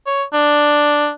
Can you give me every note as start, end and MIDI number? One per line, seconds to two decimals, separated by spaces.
0.07 0.23 73
0.33 1.11 62